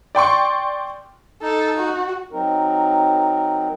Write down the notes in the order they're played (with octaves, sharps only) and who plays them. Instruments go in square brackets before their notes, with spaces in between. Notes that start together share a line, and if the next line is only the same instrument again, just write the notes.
[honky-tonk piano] D5 G5 C6 C#6
[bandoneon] D#4 [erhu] A4
[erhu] F#4
[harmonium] F#3 C4 D#4 A#4